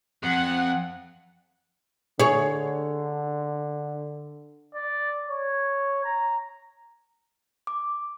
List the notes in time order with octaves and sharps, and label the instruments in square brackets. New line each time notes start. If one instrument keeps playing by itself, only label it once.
[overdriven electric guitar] F2 [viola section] F#5
[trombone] D3 [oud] G#4 C#5
[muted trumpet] D5
C#5
A#5
[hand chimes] D6